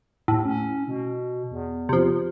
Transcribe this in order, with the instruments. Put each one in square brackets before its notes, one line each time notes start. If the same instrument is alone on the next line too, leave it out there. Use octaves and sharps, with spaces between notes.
[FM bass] D#2 [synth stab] A2
[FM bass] C#4
B2
E2
[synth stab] C3 F3